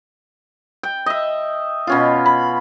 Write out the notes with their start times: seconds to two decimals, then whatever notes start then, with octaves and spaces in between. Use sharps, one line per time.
0.83 G5
1.06 D#5 E5
1.87 B2 C#4 F4
2.26 B5